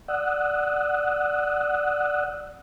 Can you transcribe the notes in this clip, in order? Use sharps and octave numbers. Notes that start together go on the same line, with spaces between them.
D5 F#5 D#6 E6 F#6